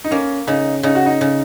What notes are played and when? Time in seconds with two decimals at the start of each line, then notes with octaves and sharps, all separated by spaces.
0.04 D#4
0.11 A#3 C#4
0.47 C#3 D#4
0.83 C#3 D#4
0.95 F#4
1.06 D#4
1.21 C#3